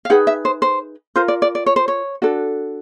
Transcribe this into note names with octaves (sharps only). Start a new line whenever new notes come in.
F5
D#4 G#4 B4 F#5
E5
C5
C5
F4 A#4 C5
D5
D5
D5
C#5
C5
C#5
D4 F#4 A4